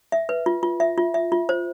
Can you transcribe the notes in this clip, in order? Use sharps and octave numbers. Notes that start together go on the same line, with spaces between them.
E5
B4
F4
F4
E5
F4
E5
F4
C5